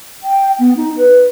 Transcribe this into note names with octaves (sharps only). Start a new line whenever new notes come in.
G5
B3
D#4
B4